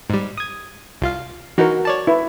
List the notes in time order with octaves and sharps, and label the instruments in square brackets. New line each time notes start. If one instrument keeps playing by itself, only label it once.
[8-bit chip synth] G#2 G3
D#6 G#6
C2 F4 F5
[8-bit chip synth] E3 D#4 [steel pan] F#4 A#4
[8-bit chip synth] C#5 D5 A5
[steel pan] E4 B4